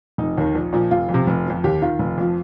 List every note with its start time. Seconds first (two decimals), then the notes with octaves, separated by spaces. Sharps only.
0.18 F1 D#4
0.38 D#2 D#3
0.55 A#1
0.73 A#2 F3
0.91 F1 F4
1.09 F2
1.14 C3
1.27 F1
1.46 F2 F3
1.64 D#2 G4
1.82 D#3 F4
1.99 F1
2.18 F2 F3